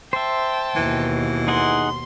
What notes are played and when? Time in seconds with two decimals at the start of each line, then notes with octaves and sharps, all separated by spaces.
0.13 C5 E5 G5 A5
0.76 D#2 B2 E3
1.48 D#4 G#4 F#5 C6